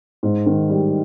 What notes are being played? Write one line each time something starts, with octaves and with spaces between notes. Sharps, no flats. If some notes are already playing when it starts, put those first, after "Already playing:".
G#2
D#3
G3